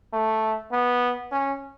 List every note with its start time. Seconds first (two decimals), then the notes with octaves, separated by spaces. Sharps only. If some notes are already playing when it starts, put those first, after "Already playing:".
0.13 A3
0.72 B3
1.32 C#4